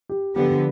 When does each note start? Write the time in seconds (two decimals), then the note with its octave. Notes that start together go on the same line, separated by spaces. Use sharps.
0.09 G4
0.36 D3 F3 B3 G4